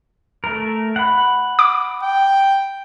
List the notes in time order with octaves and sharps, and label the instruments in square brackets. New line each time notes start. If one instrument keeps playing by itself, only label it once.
[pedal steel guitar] A3 A#4
F#5 B5
[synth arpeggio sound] D6
[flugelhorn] G5